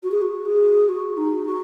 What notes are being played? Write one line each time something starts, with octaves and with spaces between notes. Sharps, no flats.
F#4
G#4
F#4
G#4
F#4
D#4
F#4